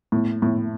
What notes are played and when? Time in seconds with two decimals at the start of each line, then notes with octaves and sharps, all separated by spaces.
0.12 A2
0.42 A2